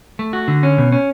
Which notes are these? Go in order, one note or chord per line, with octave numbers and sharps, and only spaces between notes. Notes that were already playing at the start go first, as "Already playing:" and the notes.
A3
F#4
D3
C#4
B2
C#4